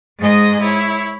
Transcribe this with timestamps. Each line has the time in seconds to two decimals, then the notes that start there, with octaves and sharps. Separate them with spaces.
0.18 G#2 G#3 G#4 D#5 D#6
0.62 E4 C#5